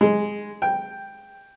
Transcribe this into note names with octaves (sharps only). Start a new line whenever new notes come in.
G#3
G5